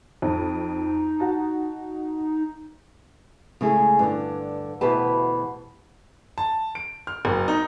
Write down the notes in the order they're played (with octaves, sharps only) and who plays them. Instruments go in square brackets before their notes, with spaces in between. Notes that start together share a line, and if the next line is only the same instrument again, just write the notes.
[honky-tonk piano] F2 [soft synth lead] D#4
[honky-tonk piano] F#4 A5
[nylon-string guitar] C#3 G#3 A3 E4 G#4
G2 D3
D2 B2 E3 G4 B4 A5
[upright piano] A5
D7
F6
F#1
D#4